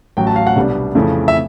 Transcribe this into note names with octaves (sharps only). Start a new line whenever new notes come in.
A1 A2 F#3 G5
A5
F5
F#5
C2 B2 G3 B3 D4
F2 C#3 E3 A3
E5